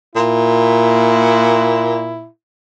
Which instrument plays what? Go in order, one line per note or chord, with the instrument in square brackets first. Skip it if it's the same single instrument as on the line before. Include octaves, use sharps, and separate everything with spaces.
[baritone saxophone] A#2 [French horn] E4